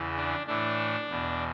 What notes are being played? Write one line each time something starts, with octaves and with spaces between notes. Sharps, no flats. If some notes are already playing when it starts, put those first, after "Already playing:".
Already playing: E2 C#3 E3
D4
A2 E3 D4
E2 B2